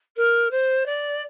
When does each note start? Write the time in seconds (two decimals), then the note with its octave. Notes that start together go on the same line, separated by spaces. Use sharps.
0.16 A#4
0.50 C5
0.85 D5